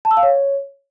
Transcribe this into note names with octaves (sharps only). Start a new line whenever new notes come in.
A5
E6
F5
C#5